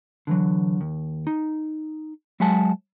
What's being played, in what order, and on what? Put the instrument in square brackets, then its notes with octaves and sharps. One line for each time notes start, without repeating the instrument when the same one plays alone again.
[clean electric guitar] D3 E3 F#3
D#2
D#4
F#3 G#3 E5 F#5 G#5 A5